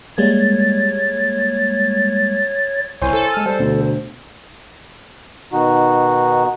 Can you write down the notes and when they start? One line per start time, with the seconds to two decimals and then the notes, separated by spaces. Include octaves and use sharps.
0.18 G3 G#3 A#3 C#5 A6
3.02 C2 E4 C5 C#5 G#5
3.13 A4
3.34 G#3 F6
3.46 G3 C5
3.59 D2 B2
5.53 B2 D#3 D#4 F#4